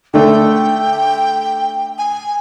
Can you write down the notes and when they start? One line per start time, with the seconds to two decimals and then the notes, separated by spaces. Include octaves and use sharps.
0.14 D3 A3 G5
1.98 G#5